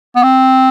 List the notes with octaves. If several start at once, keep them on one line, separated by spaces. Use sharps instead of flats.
B3
C4